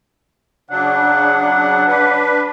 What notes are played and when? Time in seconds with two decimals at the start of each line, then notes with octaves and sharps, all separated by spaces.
0.70 C#3 F#3 D4 F#5
1.88 D4 B4